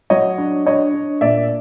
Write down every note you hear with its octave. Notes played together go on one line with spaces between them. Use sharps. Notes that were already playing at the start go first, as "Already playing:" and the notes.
F#3 C#5 D#5
D4
D4 C#5 D#5
D4
A#2 D5 E5